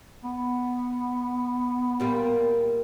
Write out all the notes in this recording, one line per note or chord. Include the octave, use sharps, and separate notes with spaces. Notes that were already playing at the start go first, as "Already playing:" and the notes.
B3
A#2 G3 A#3